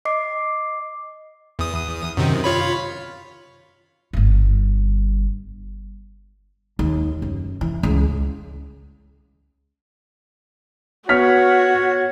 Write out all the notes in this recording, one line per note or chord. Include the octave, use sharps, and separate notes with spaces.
D#5 D6 C7
E2 D#6
F#2 C3 D#3
F4 C#5 B5
G1 G2
D#2
F#2
E3
C#2
B3 F#4 C#5 F6 B6